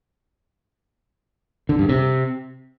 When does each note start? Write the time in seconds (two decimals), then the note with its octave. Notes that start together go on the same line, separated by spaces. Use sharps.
1.69 D3
1.79 G2
1.89 C3